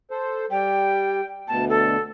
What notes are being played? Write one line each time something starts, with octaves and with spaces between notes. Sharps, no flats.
A4 C5
G3 G5
D2 B2 A5
A4